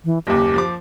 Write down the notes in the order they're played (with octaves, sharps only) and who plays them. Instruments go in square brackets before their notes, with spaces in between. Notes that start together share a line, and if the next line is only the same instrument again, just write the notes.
[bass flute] E3
[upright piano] F#1 D#2 [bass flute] G4
[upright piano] F3 C5 D6